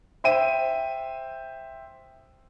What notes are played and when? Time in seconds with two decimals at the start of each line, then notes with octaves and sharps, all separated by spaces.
0.24 C5 E5 G5 D#7